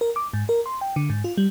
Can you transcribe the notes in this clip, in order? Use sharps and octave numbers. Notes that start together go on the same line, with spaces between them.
A#4
D6
G#2
A#4
C6
G5
D3
G#2
F4
G3